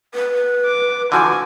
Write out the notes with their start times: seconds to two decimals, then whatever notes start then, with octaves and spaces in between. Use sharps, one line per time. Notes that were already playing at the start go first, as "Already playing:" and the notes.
0.14 B4
0.66 D6
1.12 D3 E3 F3 F#4 G#5